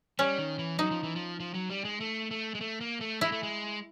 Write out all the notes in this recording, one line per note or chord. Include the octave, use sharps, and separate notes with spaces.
G3 C#4
D#3
E3
F#3 D#4
F3
E3
F3
F3
F#3
G3
G#3
A3
A3
G#3
A3
A#3
A3
G#3 E4
A3
G#3